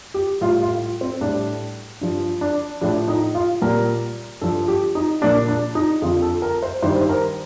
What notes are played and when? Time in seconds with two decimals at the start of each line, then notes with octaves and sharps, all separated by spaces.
0.14 G4
0.41 A2 G3 F4
0.62 F4
1.01 C4
1.21 A2 G3 D4
2.01 G2 F3
2.41 D4
2.81 A2 F3 D4
3.08 D#4
3.35 F4
3.62 A#2 G3 A#4
4.41 G2 F3 A4
4.68 G4
4.95 D#4
5.22 A#2 F3 D4
5.48 D4
5.75 D#4
6.02 F2 D3 F3 F4
6.22 A4
6.42 A#4
6.62 C5
6.82 G2 D#3 G3 C5
7.01 C5
7.09 A#4